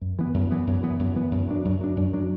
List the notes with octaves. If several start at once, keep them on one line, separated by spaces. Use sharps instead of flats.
F#2
E3 B3
F#2
E3 B3
F#2
E3 B3
F#2
E3 B3
F#2
F#3 D4
F#2
F#3 D4
F#2
F#3 D4